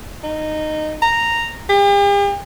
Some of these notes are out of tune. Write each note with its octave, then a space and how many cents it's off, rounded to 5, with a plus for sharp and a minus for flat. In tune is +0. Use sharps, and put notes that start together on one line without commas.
D#4 -15
A#5 -10
G4 +45